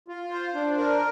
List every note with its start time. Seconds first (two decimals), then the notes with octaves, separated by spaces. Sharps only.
0.08 F4
0.31 C5
0.55 D4
0.78 A#4